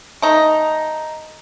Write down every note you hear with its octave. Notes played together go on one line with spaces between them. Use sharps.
A3 D#4